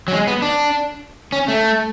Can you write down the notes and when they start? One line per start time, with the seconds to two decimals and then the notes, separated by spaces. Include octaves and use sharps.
0.08 F#3
0.13 G#3
0.27 B3
0.42 D4
1.32 C#4
1.48 A3